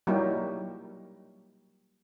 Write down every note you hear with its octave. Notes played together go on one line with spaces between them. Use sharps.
F#3 G3 A#3 D#4 E4 G4